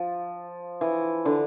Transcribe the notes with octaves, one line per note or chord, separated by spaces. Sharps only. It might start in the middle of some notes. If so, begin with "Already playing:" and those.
Already playing: F3
E3
D3